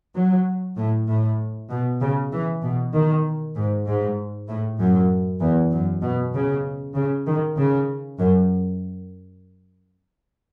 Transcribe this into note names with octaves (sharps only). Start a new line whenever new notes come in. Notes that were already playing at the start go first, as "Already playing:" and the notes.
F#3
A2
A2
B2
C#3
E3
B2
D#3
G#2
G#2
A2
F#2
E2
F#2
B2
C#3
C#3
D#3
C#3
F#2